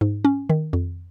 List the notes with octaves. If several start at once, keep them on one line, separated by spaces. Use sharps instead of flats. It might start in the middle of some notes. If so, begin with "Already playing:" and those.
G#2
C#4
D#3
F2